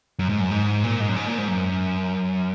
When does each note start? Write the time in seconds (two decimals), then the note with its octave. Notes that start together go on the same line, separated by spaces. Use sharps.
0.19 F#2
0.29 G#2
0.40 F#2
0.51 G#2
0.84 A#2
1.00 G#2
1.09 F#2
1.16 G#2
1.26 A#2
1.38 G#2
1.48 F#2